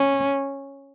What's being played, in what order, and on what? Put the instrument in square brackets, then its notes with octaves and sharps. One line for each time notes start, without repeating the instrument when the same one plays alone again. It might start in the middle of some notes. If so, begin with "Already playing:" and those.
Already playing: [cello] C#4